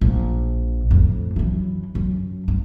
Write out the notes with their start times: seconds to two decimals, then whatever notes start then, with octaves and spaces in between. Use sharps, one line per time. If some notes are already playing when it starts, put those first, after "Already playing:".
0.01 A#1
0.91 F2 A2
1.36 F#2 E3
1.95 F#2
2.48 G2